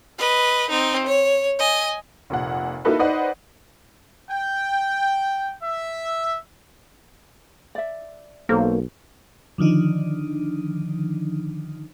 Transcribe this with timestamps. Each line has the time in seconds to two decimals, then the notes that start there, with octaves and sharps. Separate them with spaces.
0.18 B4 D#5
0.70 C4 D#4
1.06 C#5
1.59 D#5 G#5
2.30 F1 A#2 F#5
2.85 A#3 D#4 E4 F#4 A4 B4
2.99 D#4 B4 C5 D5 D#5 F#5
4.30 G5
5.63 E5
7.75 D5 E5
8.49 B1 A#3 F#4 A4 C5
9.58 D3 D#3 F3 D4 D#4